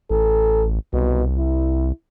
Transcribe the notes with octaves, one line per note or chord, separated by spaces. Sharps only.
A1 A4
C2 B2
E4